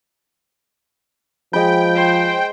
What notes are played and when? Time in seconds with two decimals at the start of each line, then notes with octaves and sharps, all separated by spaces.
1.53 F3 G#3 G5 B5
1.95 C5